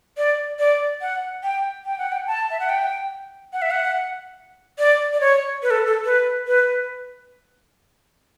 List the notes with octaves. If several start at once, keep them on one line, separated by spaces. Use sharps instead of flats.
D5
D5
F#5
G5
G5
F#5
G5
A5
E5
F#5
G5
F#5
E5
F#5
D5
D5
C#5
B4
A4
A4
B4
B4